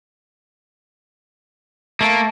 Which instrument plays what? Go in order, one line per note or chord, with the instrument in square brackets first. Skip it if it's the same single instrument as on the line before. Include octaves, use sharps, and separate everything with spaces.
[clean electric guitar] A3 [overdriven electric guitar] A#3